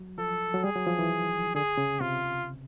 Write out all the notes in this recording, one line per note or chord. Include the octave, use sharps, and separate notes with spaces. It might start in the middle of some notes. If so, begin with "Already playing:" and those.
Already playing: F#3
F3 A4
F#3
G3 G#4
F#3
F3
E3
D3 G#4
C#3
C3 F4